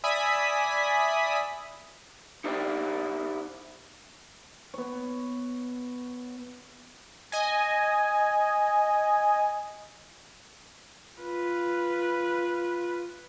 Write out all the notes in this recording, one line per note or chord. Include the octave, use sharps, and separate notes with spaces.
D5 E5 G#5 B5 D#6 B6
D#4 E4 G4 C5 D5
B3 C#5
D#5 G#5
F4 B4